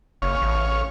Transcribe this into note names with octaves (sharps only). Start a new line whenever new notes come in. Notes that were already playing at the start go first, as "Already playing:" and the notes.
F#1 C#4 C#5 F5
A1